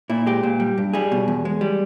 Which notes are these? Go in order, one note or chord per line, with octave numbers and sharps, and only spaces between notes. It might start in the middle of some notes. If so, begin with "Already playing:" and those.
A#2 E4
G#3 G4
A#2
G3
G2
G3 G#4
B2
E2
G#3
G3